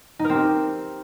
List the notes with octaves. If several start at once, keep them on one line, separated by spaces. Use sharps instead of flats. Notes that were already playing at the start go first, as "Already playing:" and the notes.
D#4
A#4
C4
G4